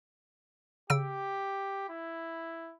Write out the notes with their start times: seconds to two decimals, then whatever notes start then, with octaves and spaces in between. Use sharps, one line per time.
0.90 C#3 G4 E6 D7
1.89 E4